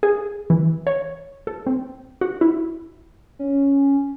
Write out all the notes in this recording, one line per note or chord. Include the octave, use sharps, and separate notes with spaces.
G#4
E3
C#5
A4
C4
F#4
E4
C#4